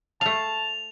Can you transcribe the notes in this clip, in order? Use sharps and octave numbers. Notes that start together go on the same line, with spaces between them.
A3 F5 A5 F7